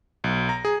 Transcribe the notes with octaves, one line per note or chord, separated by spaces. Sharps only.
B1
A#5
G#4